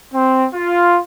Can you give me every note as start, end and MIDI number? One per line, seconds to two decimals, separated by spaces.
0.13 0.47 60
0.54 1.00 65